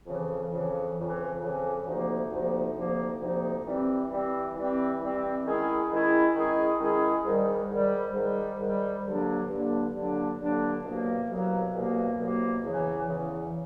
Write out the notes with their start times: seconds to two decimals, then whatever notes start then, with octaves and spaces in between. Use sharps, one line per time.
0.06 F2 C#3 E3
0.51 F2 C#3 E3
0.96 F2 C#3 E3
1.41 F2 C#3 E3
1.85 D2 C3 F3 A#3 D#4
2.30 D2 C3 F3 A#3 D#4
2.75 D2 C3 F3 A#3 D#4
3.20 D2 C3 F3 A#3 D#4
3.65 E3 G3 C4
4.11 E3 G3 C4
4.55 E3 G3 C4
5.00 E3 G3 C4
5.45 D#3 G#3 C#4 E4 G#4
5.90 D#3 G#3 C#4 E4 G#4
6.34 D#3 G#3 C#4 E4 G#4
6.79 D#3 G#3 C#4 E4 G#4
7.24 G#2 D#3 G3
7.70 G#2 D#3 G3
8.14 G#2 D#3 G3
8.60 G#2 D#3 G3
9.04 G2 D3 F#3 A#3 D4
9.49 G2 D3 F#3 A#3 D4
9.94 G2 D3 F#3 A#3 D4
10.39 G2 D3 F#3 A#3 D4
10.84 C2 B2 F#3 A#3
11.28 C2 B2 F#3 A#3
11.74 C2 B2 F#3 A#3
12.18 C2 B2 F#3 A#3
12.63 E2 C#3 E3
13.09 E2 C#3 E3